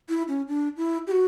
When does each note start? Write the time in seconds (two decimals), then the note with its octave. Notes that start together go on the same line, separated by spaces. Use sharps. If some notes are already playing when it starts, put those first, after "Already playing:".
0.09 E4
0.28 C#4
0.48 D4
0.77 E4
1.07 G4
1.11 F#4